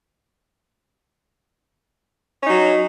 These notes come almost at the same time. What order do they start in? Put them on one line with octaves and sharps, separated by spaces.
C#4 D#4 F#3